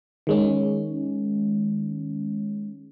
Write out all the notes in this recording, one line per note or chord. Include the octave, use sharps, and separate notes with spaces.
D#3 G#3 C#4